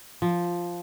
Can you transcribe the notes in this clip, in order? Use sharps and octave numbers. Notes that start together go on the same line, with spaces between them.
F3